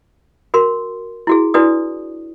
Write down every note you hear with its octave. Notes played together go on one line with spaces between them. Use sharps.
F#4 A#4 C6
E4 F#4 G#4
D4 E4 F#4 B4 D5 D#6